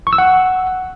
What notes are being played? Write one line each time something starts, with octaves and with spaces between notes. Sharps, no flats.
C#6
E6
F#5